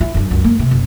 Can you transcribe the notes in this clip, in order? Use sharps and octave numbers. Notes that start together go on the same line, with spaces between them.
E4
F#2 D4
C#2 F#2
A#3
C3
F#1